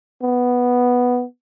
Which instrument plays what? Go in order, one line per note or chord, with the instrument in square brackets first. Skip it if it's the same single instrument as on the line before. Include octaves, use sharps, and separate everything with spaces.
[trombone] B3